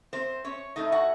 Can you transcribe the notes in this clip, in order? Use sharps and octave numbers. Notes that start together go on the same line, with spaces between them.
C4 C5
C#4 C#5
A2 A3 C#4 D#4 D#5
F#4 F#5